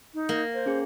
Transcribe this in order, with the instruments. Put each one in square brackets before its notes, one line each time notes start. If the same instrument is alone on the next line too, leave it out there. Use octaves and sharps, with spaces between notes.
[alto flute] D#4
[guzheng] A#3
[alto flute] C5
[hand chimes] C#4 G#4